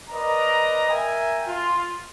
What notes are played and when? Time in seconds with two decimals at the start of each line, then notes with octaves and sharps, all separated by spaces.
0.10 A#4 B4 D5 D#5 A#5
0.90 A#4 E5 G5 G#5
1.48 F4